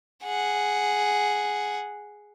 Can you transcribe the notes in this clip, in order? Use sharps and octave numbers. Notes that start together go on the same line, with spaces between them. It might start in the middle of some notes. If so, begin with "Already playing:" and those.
G#4 F#5